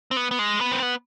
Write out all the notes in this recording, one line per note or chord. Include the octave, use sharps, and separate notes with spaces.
C4
B3
B3
G#3
B3
C4
B3